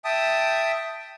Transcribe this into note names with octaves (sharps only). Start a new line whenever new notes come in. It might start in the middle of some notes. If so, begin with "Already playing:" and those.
E5 G5 A5 D#6